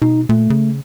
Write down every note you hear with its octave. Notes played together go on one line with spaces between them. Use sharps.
B2 D#4
A#2 A3
C#3